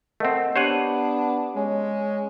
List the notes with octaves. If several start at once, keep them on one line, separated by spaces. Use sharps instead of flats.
A3 C4 A#4 D#5 F#5
B3 D4 G4 C5 C#5 F#5 D#7 F#7
G#3 C#4